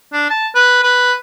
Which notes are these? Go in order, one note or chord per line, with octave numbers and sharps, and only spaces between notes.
D4
A5
B4
B4